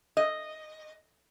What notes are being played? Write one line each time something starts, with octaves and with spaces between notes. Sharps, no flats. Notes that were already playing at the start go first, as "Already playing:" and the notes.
D#5